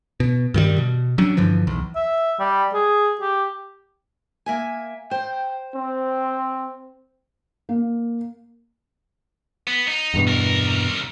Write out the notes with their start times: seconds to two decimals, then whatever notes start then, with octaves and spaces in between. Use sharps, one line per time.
0.20 B2
0.54 G2 D#3 E3 G3
0.78 B2
1.18 F#3 G3 C#4 D4
1.37 G2 D3 E3 F3
1.67 B1 E2
1.95 E5
2.40 G3
2.74 G#4
3.21 G4
4.46 A#3 E5 G#5
5.11 C5 G5
5.75 C4
7.69 A#3
9.67 B3
9.88 D#4
10.14 E2 G2 B2
10.27 C2 A#4